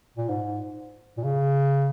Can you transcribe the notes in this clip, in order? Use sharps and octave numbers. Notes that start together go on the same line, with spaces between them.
A#2
G#2
A#2
C#3